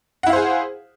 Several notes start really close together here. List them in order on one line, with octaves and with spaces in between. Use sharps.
F#5 E4 F5 C5 G#4